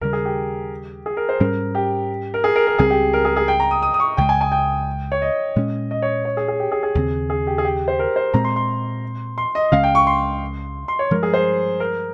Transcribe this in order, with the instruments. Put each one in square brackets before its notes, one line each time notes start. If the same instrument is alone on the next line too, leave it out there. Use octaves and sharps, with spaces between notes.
[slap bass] D#2 C#3 G3 [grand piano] A#4
[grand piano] G#4
G4
G#4
A#4
C5
[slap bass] G#2 G3 C#4 [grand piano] A#4
[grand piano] G4
A#4
G#4
A#4
A#4
[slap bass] C#2 C#3 G3 C4 [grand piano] G#4
[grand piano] G4
A#4
G#4
G#4
G5
A#5
D#6
D#6
D#6
C#6
[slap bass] C#2 C#3 G#3 [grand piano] G5
[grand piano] G#5
G#5
G5
C#5
D#5
[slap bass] A#2 G#3 C#4
[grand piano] D#5
C#5
C#5
G#4
G#4
G4
G#4
G#4
[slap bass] D#2 C#3 G3 C4
[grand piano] G#4
G4
G#4
G4
C5
A#4
C5
[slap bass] A#2 G#3 C4 [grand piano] A#5
[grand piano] C6
C6
C6
D#5
[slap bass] C#2 C#3 G#3 C#4 [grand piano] F5
[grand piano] G5
C#6
C6
C6
C#5
[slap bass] G2 F3 G#3 [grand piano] A#4
[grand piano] G#4
C5
A#4